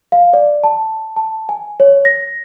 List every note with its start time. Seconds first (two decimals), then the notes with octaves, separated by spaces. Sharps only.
0.12 F5
0.33 D5
0.64 A5
1.16 A5
1.49 G#5
1.80 C#5
2.05 A#6